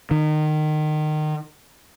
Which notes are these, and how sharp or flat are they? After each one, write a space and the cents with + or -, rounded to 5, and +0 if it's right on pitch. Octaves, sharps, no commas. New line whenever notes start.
D#3 -25